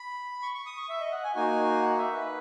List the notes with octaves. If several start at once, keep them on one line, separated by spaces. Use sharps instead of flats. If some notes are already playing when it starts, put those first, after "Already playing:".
Already playing: B5
C#6
C#6
D#6
C#6
E5
D#5
F#5
G#5
A#3 D#4 F#4 G#5
F#5
E5
B4